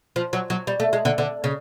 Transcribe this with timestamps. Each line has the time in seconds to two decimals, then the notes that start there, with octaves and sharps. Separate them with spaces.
0.16 F3
0.33 F#3
0.50 F#3
0.67 G3
0.80 A3
0.93 G#3
1.05 D3
1.18 D3
1.44 C#3